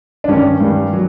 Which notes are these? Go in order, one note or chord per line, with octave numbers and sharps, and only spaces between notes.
D4
G2 D#3 G3 C#4
G2 D#3 G3
F#3